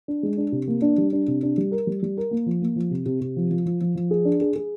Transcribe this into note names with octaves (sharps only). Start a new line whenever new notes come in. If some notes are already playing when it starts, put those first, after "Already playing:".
D4
G#3
D4
C3
A#3
D4
G3
D4
C3
D4
G3
A#4
G3
G3
A#4
A#3
F3
A#3
F3
C3
C3
C3
F3
F3
F3
F3
F3
G#4
D4
G#4
G#4